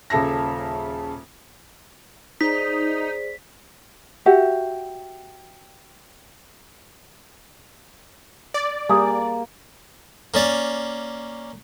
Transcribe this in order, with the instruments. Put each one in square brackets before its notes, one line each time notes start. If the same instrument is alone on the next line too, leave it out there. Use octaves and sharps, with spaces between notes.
[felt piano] D#1 C#3 A4 E5 A#6
[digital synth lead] D#4 [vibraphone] G#4 C5 D5 [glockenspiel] B6
[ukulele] F#4 G4 E5 F#5
[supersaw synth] D5
[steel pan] G3 G4 [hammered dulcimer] A#3 [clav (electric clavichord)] G#4
[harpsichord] A#3 C#4 D5